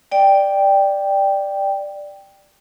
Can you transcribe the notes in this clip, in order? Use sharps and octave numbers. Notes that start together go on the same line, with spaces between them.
D5 G5